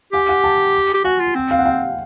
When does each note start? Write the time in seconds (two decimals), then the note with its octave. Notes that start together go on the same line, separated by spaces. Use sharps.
0.13 G4 F#5 G#5
0.29 F#5 G#5
0.44 G5 A5
0.94 G4
1.04 F#4 F#5 G#5
1.20 F4
1.35 C4
1.51 F5
1.59 F#5
1.65 F5 G5